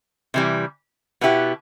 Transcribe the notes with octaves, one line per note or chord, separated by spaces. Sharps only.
C3 E3 G3
B2 B3 E4 G4